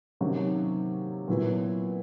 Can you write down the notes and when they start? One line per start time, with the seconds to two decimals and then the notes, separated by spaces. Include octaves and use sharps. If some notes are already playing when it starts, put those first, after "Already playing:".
0.21 C3 D#3 F#3 A#3 C#4
1.28 A#2 F#3 B3 E4